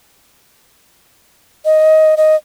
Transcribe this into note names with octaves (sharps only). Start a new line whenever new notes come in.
D#5
D#5